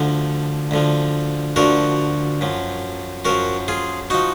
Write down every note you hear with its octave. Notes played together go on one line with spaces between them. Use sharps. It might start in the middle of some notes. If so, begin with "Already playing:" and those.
Already playing: D2 D3 F3
D2 D3 F3
D2 D3 F3 F#4 A#4
F#2 F3
F#2 F3 F#4 A#4
F4 G#4
F3 D#4 F#4